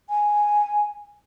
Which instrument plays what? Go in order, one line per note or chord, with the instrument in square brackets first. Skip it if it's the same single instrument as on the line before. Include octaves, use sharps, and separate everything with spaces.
[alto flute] G#5